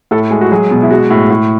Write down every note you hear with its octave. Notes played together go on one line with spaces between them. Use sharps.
A2 A4
G#3 G#4
F#4
F#3 G#4
B2
E4
G#3 F#4
A2
A2